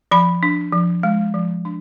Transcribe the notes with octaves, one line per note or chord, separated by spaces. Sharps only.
F3 B5
D4
F3
G#3
F3
D4